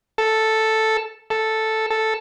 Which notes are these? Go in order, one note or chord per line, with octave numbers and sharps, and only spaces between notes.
A4
A4
A4